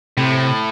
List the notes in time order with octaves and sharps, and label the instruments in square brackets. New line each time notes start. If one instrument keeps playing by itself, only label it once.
[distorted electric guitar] A2 [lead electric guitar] C3